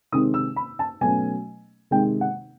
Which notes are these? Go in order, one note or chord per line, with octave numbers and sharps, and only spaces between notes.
C3 D#3 G#3 C4 D#6
E6
B5
A5
B2 F#3 A3 C#4 G#5
C3 D#3 G#3 G5
F#5